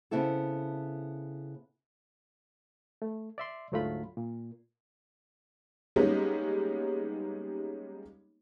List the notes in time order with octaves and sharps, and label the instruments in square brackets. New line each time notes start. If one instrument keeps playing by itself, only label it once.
[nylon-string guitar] C#3 B3 C4 E4 A4
[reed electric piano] A3
D5 E5 C6
D2 G#2 F#3 A3 F4 B5
A#2
[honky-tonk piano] G3 G#3 A#3 B3 C#4 D#4